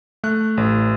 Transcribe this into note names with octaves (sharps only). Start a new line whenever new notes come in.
A3 F#6
A1